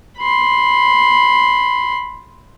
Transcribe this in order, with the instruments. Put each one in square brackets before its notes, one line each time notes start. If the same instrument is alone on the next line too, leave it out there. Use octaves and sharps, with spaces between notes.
[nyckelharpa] B5 C6